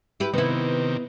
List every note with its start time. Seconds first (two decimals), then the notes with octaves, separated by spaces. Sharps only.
0.20 E4 G4 B4
0.34 C3 D#3 B3 E4